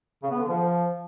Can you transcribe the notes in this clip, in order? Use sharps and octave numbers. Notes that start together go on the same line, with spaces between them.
C#3
B3
D3
F3